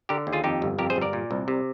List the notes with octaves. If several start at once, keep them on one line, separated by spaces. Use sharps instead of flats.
D3 G4 A#4
D#2
F4 G#4
F2 D#4 G4
G1
F2 G4 A#4
G#4 C5
G1
A#4 D5
A#2
C2
C3